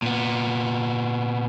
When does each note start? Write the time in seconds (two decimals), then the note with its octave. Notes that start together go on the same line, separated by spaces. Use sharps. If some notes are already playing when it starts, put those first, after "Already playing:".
0.02 A#2 B3